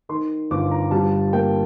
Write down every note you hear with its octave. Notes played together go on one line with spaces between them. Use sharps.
D#3 C6
G1 D6
A#5
G3 A5
A#3 G5